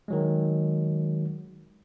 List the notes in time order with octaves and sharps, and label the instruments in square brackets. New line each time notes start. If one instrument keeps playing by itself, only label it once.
[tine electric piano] D#3 F#3 G#3